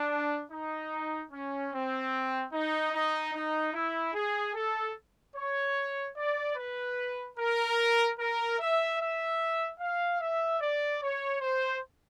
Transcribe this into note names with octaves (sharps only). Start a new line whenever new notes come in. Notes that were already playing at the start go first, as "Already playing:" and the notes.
Already playing: D4
D#4
C#4
C4
D#4
D#4
D#4
E4
G#4
A4
C#5
D5
B4
A#4
A#4
E5
E5
F5
E5
D5
C#5
C5